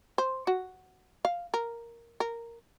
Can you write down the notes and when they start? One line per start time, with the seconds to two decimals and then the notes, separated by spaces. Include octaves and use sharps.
0.18 C5
0.47 F#4
1.25 F5
1.54 A#4
2.20 A#4